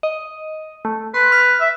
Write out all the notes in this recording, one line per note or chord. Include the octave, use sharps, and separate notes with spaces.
D#5
A3
B4 C6
F6
E5